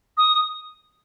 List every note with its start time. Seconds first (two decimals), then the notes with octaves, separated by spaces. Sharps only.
0.17 D#6